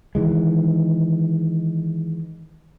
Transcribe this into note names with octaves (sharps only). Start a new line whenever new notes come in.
D#3 E3 G#3